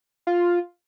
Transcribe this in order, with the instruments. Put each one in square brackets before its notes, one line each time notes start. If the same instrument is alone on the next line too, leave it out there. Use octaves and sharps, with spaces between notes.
[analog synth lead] F4